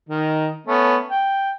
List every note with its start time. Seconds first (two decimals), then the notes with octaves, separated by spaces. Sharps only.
0.09 D#3 D#4
0.67 A3 B3 C#4
1.11 G5